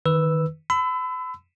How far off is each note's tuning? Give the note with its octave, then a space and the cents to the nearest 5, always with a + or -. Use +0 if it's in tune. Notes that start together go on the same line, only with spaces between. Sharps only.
D#3 +0 B4 +0 E6 +0
B5 +40 E6 -5